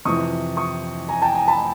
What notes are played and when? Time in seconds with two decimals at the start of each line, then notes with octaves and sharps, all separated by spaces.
0.05 F2 C3 E3 C#6 D#6
0.57 C#6 D#6
1.09 G#5 A#5
1.22 G5 A5
1.35 G#5 A#5
1.48 A5 B5